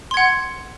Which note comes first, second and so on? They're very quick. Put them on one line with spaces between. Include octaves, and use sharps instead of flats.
C6 G#6 F#5